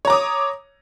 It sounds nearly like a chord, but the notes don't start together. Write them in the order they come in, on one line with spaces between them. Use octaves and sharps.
C#5 A#5 D6 D#6